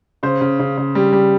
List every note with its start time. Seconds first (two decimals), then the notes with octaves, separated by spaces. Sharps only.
0.23 C#3 C5
0.41 C#3
0.59 C#3
0.77 C#3
0.95 G3
1.13 G3